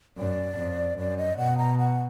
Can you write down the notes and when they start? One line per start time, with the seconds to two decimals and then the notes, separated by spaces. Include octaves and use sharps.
0.17 F#2 D5
0.57 F2
0.98 F#2 D5
1.18 D#5
1.38 B2 F#5
1.58 A#5
1.78 F#5